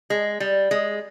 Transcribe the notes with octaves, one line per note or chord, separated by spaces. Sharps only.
G#3
G3
G#3